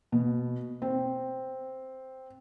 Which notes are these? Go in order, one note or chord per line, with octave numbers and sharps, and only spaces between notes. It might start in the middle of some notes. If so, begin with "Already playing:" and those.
B2
C4